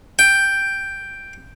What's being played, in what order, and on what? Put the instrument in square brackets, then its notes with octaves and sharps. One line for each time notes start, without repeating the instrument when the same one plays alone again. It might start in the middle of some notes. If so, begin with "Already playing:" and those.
[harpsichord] G5